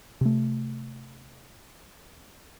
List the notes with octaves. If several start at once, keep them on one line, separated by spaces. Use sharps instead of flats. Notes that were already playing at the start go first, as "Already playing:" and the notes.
C3 A3